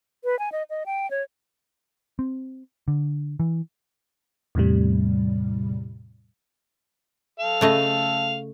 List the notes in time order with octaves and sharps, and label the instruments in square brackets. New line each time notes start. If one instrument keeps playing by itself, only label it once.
[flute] B4
G#5
D#5
D#5
G5
C#5
[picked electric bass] C4
D3
E3
[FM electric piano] E2 A2 C3 G3
[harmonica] A4 F5
[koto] C#3 A3 D#5